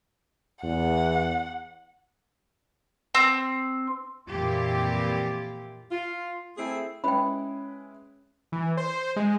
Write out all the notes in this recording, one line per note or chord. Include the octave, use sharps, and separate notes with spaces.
E2 F#5
C4
F2 A#2 E3 E4 F4 G4
F4
A3 C4 E4 G#4
G#3 C#4 E4 B4 G5 B5
E3
C5
G#3